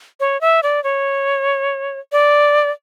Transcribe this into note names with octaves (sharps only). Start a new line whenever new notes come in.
C#5
E5
D5
C#5
D5